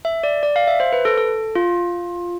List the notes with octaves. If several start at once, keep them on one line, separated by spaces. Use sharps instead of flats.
E5
D5
D5
F5
E5
C5
B4
A4
A4
F4